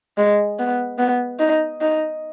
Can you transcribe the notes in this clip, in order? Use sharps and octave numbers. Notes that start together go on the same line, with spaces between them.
G#3
B3
B3
D#4
D#4